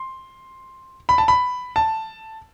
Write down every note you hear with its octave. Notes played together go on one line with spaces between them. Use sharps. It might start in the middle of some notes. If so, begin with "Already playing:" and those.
Already playing: C6
B5
A5
B5
A5